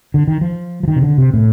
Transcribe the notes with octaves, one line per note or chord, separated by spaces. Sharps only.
D3
D#3
F3
F3
D#3
C3
D3
C3
A2